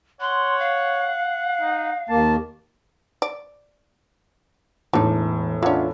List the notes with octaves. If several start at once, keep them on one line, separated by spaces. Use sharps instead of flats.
C#5 F#5 C6
F5
D#4
D#2 A#3 A5
D5
E1 A2 E3 D4 D#4
A#3 C#4 D4 F4 E5 F#5